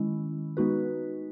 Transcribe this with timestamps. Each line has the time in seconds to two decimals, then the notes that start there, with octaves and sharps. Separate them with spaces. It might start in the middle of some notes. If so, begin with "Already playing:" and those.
Already playing: D#3 G#3 C#4 E4
0.57 G#3 B3 D#4 F#4 B4